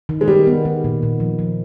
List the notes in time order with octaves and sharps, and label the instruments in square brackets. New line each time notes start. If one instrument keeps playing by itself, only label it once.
[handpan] D#3
[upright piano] G#3
[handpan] D#3 [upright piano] G3
[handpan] B3
D#3
A#2
A#2
F3
F3